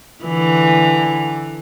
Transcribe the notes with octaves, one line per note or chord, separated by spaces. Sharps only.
D3 E3